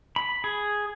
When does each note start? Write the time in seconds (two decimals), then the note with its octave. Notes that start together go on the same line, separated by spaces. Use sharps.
0.16 B5
0.44 G#4